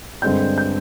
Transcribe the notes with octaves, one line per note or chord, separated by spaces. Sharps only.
G2 D3 G#3 C4 G6
G6